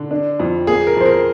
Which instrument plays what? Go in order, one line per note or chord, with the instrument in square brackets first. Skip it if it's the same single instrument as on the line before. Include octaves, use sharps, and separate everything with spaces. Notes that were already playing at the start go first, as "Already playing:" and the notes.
Already playing: [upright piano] D3
D4
F2
[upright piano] A#3 [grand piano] G#4
[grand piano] A#4
[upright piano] F2 [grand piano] C5
[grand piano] A#4